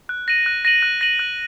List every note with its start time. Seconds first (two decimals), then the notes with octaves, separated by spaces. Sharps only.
0.09 F#6
0.28 A#6 D#7 F#7
0.46 F#6
0.65 A#6 D#7 F#7
0.83 F#6
1.01 A#6 D#7 F#7
1.19 F#6